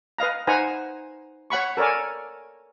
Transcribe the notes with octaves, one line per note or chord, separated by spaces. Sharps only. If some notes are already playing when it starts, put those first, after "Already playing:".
B4 D#5 F5 A#5
D#4 B4 C5 F#5 G#5 A#5
C#5 F#5 B5 C#6
A4 A#4 C#5 D5 G#5